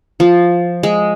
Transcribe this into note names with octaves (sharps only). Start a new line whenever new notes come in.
F3
G#3